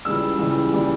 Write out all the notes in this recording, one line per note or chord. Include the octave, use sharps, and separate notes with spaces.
C#2 C#3 E3 G3 E6
C#2 C#3 E3 G3
C#3 E3 G3